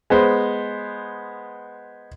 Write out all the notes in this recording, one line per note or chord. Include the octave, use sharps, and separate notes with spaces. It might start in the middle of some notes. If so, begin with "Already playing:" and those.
G#3 B3 C5